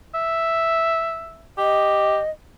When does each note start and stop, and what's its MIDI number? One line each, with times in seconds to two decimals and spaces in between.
0.14 1.46 76
1.58 2.18 67
1.58 2.30 75